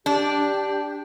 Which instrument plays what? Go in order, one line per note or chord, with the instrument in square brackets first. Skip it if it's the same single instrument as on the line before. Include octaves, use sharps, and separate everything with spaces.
[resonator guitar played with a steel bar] D4 [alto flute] G4